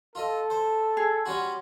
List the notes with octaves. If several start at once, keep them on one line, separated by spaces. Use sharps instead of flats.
F4 A4 D#5
C5
G#4
G3 C#4 F#4 C6